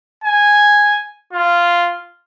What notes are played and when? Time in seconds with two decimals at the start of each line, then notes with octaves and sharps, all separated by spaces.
0.24 G#5
1.33 F4